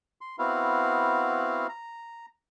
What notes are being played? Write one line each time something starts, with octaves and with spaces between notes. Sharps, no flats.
C6
B3 C4 E4 F#4 F5
A#5